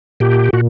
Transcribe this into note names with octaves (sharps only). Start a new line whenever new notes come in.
A#2 G4
A#2 F#4